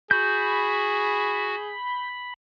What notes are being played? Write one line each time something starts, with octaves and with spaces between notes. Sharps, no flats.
F#4 G#4 B5 G6